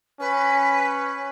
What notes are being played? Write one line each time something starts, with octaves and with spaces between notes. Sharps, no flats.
C#4 B4